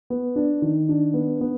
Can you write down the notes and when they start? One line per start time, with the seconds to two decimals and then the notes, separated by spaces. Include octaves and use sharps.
0.10 B3
0.36 D4
0.62 D#3
0.89 D4
1.14 B3
1.41 B3